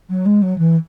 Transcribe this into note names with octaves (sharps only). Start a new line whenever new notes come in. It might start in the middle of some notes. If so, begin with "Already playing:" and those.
F#3
G#3
F#3
E3